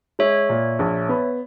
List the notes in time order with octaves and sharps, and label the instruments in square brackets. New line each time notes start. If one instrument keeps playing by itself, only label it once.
[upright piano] G#3 [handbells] C#5 E5
[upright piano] A#2
A#1
B3